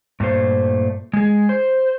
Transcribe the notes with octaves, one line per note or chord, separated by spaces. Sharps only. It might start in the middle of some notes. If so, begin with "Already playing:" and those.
G2 A#2 A3 C5
G#3 G#4
C5